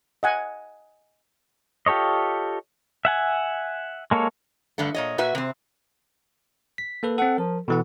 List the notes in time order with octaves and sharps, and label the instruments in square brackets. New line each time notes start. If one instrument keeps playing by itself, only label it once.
[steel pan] D#5 F#5 G#5
[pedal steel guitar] F4 G4 A4 C#5 D#5
E5 F#5 G#5
G#3 A#3 A4 C#5
[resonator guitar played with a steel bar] G2 D3 A3
A#2 C#5 D#5
A#2 F#4 B4 E5
C3 C4
[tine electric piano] B6
A#3 A4 B4
[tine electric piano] C4 A4 [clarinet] F#5
[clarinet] F3 [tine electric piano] A#4
[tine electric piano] B2 E3 F#5 [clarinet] A4